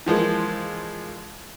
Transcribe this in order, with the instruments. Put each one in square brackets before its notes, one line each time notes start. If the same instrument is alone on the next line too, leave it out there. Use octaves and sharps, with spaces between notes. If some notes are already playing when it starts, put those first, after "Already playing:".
[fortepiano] E3 F3 G#3 A#3